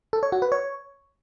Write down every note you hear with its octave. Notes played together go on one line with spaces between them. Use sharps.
A4
C#5
F#4
B4
C#5